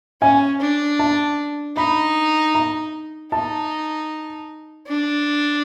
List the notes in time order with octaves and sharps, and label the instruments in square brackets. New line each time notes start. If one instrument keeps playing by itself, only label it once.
[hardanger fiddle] C#4 [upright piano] G#5
[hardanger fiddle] D4
[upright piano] A5
[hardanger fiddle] D#4 [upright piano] B5
[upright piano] A#5
[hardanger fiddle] D#4 [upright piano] A5
[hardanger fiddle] D4